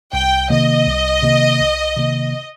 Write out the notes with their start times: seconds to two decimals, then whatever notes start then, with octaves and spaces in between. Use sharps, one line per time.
0.13 C2 G5
0.50 C3 D#3 A#3 D#5
0.86 C2
1.23 C3 D#3 A#3
1.60 C2
1.96 C3 D#3 A#3